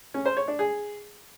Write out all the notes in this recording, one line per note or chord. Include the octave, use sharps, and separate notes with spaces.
C#4
C5
C#5
D4
G#4